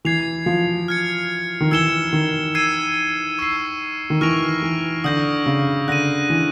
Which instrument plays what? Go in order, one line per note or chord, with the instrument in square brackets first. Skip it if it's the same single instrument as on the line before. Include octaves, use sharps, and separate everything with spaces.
[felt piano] E3 [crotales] G#6 C7 F7
[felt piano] F3
[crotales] F6 G#6 C#7
[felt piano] D#3
[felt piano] E3 [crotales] E6 G#6 C#7 E7 G7
[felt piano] D#3
[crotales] E6 G#6 C7 D#7
C#6 E6 G#6 C7
[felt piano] D#3
[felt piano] E3 [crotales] C#6 F6 A#6 D7 F7
[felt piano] E3
[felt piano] D3 [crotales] D#6 G6 A#6
[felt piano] C#3
[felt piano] D3 [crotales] F#6 A#6 D#7
[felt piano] E3